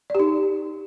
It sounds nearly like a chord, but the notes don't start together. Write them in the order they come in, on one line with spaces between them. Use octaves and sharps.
D5 G4 D#4